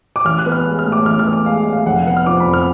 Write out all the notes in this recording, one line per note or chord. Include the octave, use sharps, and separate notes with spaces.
D6
A1 F6
F#6
B3
F6
G#3
F6
A2
D6
A1 F6
F6
B3
D6
G#3 F5
A2
F5
F1 F#5
F5
B3 F#5
F6
F3 D6
B5
F2
F6